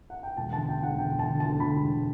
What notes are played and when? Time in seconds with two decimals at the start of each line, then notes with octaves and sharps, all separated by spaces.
0.10 F#5
0.23 G5
0.37 E1 A5
0.53 D3 A5
0.68 D3 G5
0.83 E1 F#5
0.98 D3 G5
1.14 E1
1.19 A5
1.30 D3
1.40 A5
1.45 D2
1.60 D2 B5
1.76 E1